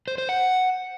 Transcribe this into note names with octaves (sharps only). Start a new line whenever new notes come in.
C5
C5
F#5